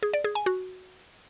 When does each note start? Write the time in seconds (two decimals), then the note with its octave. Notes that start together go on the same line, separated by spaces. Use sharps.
0.03 G#4
0.13 D5
0.24 G#4
0.35 G#5
0.46 F#4